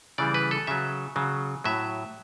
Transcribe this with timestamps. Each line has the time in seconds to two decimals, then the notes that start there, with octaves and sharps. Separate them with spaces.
0.18 C#3 E3 G3 D5
0.34 B4
0.51 A4
0.67 C#3 F#3 E5
1.16 C#3 F#3
1.64 A2 F#3 E5